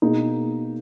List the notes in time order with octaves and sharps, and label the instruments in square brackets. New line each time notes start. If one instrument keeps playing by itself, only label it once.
[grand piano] B2 A#3 D#4 G#4